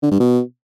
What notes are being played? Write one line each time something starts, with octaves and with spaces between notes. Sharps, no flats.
D3
G2
B2